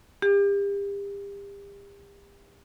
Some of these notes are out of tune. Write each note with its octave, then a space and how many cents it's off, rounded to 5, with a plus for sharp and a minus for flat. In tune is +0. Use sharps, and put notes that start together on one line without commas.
G4 +35